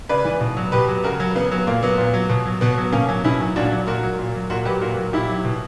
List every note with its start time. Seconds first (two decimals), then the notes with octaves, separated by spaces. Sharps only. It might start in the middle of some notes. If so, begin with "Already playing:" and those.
0.09 C#3 B4 D5
0.25 E3
0.41 B2
0.57 F#3
0.72 B2 G4 B4
0.88 F#3
1.04 C#3 F#4 A#4
1.20 F#3
1.35 C#3 B3
1.52 F#3
1.67 A#2 A#3
1.83 F#3 B3
1.98 A#2
2.14 F#3
2.29 B2
2.45 F#3
2.61 B2 B3
2.78 F#3
2.92 B2 A#3 C#4
3.09 F#3
3.24 B2 C#4 E4
3.39 F#3
3.56 A#2 D4 F#4
3.72 F#3
3.87 A#2 F#4 A#4
4.03 F#3
4.19 A#2
4.35 F#3
4.50 A#2 F#4 A#4
4.65 F#3 G4 B4
4.81 A#2 F#4 A#4
4.97 F#3
5.13 A#2 E4 G4
5.29 F#3
5.45 B2